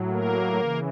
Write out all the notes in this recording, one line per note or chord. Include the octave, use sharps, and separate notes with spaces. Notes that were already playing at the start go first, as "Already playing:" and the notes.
Already playing: A2 F#3
A#3 A#4
C#3 E3